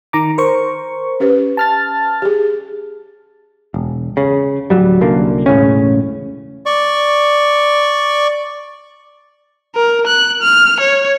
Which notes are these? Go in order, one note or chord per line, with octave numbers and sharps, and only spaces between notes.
D#3 A#5 D6
A#4 C5 C#6
C#4 G4 B4
A5 F6 A6
G4 G#4
E1
C#3
D1 C#2 F#3 G3
C2 F#2 D3 A#3
E1 A2 C#3 C#4
D5 C#6
A#4
F#6
F6
C#5